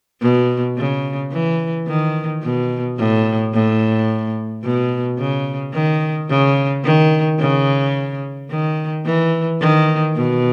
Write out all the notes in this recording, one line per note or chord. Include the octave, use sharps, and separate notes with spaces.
B2
C#3
E3
D#3
B2
A2
A2
B2
C#3
D#3
C#3
D#3
C#3
D#3
E3
D#3
B2